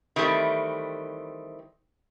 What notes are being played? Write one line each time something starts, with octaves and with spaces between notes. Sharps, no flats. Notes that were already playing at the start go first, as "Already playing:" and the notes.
D#3 E3 G3 A3 C4